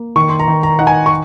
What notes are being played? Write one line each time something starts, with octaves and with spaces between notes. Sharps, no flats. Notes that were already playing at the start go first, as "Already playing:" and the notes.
Already playing: A#3
D#3 C#6
C6
A#5
D#3
A#5
D#4 F#5
G#5
C#6